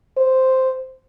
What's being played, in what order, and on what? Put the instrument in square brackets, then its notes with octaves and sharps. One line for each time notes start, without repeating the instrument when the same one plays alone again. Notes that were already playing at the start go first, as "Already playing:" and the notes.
[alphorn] C5